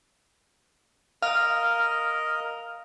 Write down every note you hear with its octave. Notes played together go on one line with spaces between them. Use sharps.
A#4 D#5 F5 F6